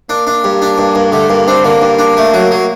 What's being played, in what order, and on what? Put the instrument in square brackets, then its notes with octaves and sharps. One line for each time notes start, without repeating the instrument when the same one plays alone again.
[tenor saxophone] A#3 [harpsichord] D4
[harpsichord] D4
G2
D4
G2
G2
[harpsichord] D3 [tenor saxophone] A3
[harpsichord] G2 [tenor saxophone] A#3
[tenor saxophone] C4 [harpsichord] D4
[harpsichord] D3 [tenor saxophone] A#3
[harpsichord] G2
D4
A3
F#3
F#3